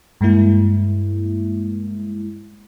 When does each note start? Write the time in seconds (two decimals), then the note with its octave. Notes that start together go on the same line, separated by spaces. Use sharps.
0.21 G2 G#3 A#3 E4